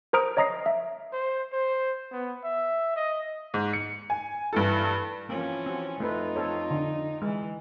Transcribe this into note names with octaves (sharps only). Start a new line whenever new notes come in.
A#4 C5 A#5 D#6 F6 D7
C#5 D#5 A#5 D#6 A#6 C7
E5
C5
C5
B3
E5
D#5
G#2
C#7
G#5
G2 E3 A4
E3 F3 A#3 C4 C#4
C4 F#4
F2 A3 C4 D#4 F4 B4
C4 A4 C#5
D3
E3 G#3